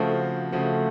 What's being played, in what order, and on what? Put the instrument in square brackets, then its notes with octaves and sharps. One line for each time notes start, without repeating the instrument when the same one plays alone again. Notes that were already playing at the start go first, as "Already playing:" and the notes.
Already playing: [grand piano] C#3 F3 C4 F#4 [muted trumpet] A3
[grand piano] C#3 F3 C4 F#4 [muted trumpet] A3